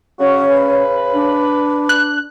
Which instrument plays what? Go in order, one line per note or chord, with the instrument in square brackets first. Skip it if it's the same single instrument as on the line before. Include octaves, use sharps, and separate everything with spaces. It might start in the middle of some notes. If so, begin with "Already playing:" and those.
[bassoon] C#3 [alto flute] C#4 [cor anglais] F#4
[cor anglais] B4
[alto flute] D4
[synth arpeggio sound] F#6